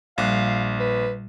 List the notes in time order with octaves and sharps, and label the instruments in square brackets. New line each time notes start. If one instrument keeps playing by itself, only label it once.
[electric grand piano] A#1 [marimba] A#2 G3 F#6 [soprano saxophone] F5
[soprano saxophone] B4